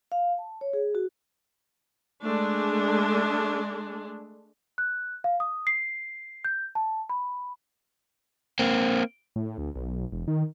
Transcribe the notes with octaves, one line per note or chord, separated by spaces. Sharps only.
F5
A5
C#5
G#4
F#4
G#3 A3 D4
F#6
F5
D#6
C7
G6
A5
B5
A#3 C4
A2
D2
B1
E1
D#3